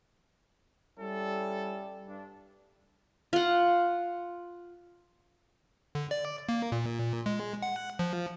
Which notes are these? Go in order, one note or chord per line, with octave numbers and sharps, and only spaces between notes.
G3 C#4 E4 A4
G2 D4
F4 F#5
D3
D5
A#3
A#2
G#3
F#5
F3